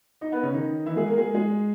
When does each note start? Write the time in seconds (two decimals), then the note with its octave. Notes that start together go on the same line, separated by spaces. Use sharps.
0.21 D#4 D#5
0.32 B3 B4
0.43 C#3 C#4
0.54 D#3 D#4
0.86 E3 E4
0.96 G#3 G#4
1.07 A#3 A#4
1.17 G#3 G#4
1.34 G#3 G#4